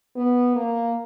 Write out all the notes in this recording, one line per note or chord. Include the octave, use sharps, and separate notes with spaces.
B3
A#3